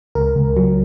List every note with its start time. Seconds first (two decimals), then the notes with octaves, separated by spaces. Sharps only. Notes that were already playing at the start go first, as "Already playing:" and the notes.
0.15 C#2 A#4
0.36 C#2
0.57 F#3